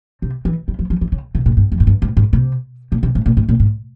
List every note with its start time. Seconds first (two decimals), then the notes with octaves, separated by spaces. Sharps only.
0.22 C3
0.45 E3
0.68 G3
0.79 F3
0.90 F3
1.01 E3
1.12 C#3
1.35 C3
1.46 A#2
1.57 G2
1.72 F2
1.80 G#2
1.87 G2
2.02 G#2
2.17 G#2
2.33 C3
2.92 A#2
3.03 C3
3.15 G#2
3.26 A#2
3.37 G#2
3.49 A#2
3.60 G#2